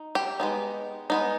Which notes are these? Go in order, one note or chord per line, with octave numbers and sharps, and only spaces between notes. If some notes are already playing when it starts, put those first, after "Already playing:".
Already playing: D#4
G4
G#3 B3 D#4
G#3 B3 D#4